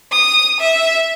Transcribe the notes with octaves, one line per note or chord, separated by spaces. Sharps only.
D#6
E5